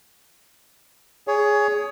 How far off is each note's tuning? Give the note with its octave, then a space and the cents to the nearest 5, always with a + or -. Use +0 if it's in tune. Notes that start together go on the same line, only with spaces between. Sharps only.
G#4 +0 C#5 +20